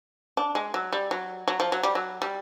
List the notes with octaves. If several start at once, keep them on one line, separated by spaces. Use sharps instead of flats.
D4
G#3
F#3
G3
F#3
F#3
F3
F#3
G3
F#3
G3